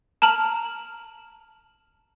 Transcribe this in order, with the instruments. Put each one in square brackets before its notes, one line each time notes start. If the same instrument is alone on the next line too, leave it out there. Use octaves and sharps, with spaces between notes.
[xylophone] A5 A#5 F6 F#7